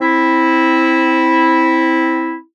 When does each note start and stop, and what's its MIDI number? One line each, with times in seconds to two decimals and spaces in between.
0.01 2.36 60
0.01 2.36 64